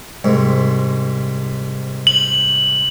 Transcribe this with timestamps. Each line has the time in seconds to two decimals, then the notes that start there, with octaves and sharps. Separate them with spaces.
0.24 C2 G#2
2.07 F#7